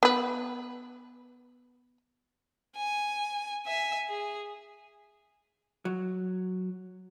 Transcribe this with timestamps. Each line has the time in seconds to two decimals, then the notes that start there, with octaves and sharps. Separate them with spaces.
0.03 B3 B4
2.76 G#5
3.66 E5 G#5
4.09 G#4
5.85 F#3